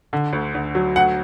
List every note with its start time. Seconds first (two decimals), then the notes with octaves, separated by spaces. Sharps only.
0.13 D3
0.33 D2
0.55 D2
0.75 F#3
0.96 D2 F#5